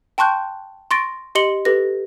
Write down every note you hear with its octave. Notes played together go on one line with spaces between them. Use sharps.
G5 A5 C6 C#6 F#6 G6
C6 C#6 A6 A#6 D7
G4 D#5 C6 C#7 F#7 G7
G4 A4 B4 A#6